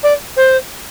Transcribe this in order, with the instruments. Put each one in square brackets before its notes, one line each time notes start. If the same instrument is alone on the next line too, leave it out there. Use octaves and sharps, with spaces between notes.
[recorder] D5
C5